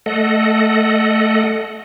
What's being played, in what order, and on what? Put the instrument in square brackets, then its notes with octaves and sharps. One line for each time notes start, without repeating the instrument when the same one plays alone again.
[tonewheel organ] A3 A4 D#5 F#5